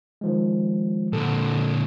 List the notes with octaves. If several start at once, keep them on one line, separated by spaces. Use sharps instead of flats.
D#3 F3 G#3
A#2 D3 A4